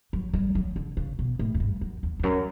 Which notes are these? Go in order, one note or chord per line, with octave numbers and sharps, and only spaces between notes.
F#3
G3
F#3
D3
C#3
B2
A2
F#2
G2
F#2
E2
E2
F#2